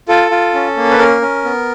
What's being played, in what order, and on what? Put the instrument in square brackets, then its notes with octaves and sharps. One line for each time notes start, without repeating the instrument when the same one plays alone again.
[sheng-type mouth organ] F4 A4
F4
C#4
A#3
B4
C#4 A#4
C#4
B3